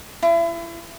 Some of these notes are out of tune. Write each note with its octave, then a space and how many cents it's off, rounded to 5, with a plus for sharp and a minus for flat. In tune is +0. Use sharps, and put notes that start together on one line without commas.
E4 +35